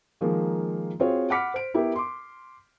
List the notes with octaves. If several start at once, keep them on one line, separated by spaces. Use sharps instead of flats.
D#3 F3 G#3 A#3
C4 F4 F#4 G#4 C5 C#5
F#5 B5 D6 F6 B6 C#7
C5 D7
B3 E4 G4 A#4
C6 D6